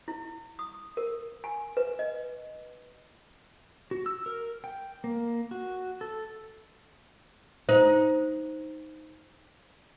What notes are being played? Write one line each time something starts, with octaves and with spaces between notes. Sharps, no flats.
E4
D#6
A#4
G#5
B4
D#5
F#4
E6
A#4
G5
A#3
F#4
A4
D#4 C5